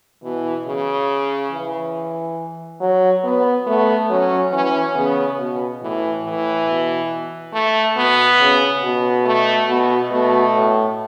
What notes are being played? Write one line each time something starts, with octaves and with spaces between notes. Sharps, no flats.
B2 E3
C#3
E3
F#3
B3
A3 B3
F#3 C#4
E3 C#4
C#3 B3
B2
A2 E3
A2 E3
B2
A3
B2 B3
C#3
B2
A3
B2 B3
B2 A3
A2